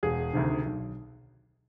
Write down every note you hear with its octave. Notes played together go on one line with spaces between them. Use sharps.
E1 G#4
D2 C3 D#3
B1